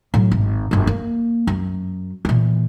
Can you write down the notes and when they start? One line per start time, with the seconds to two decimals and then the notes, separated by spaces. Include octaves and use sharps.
0.14 A2 F#3
0.32 G#1
0.71 G1 F#2
0.87 A#3
1.47 F#2
2.25 A#2 E3